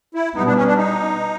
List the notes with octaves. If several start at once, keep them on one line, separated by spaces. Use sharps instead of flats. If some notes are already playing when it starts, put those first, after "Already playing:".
E4
B2 G3 B3 D#4
D4
C#4
D4
D#4